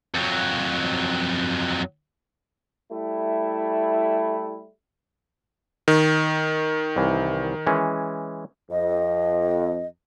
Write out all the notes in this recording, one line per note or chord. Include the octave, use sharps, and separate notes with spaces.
F2 F#3
G3 A3 E4
D#3
C2 E3
E3 G#3 C#4
F2 D#5